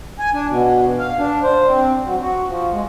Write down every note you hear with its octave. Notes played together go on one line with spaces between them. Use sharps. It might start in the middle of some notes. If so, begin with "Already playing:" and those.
G#5
D4
B2
F5
D4
C5
C4
F#3
F#4
F3
G#3